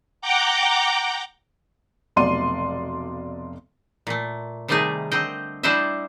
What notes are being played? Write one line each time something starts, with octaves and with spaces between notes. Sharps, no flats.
F#5 G5 A#5 D6 G6
F1 B1 D5 C6 D#7
A#2 A3
C3 D#3 G3 A3 D#4 G#4
D3 C4 D#5 G5
G3 D4 E4 C5 D#5 E5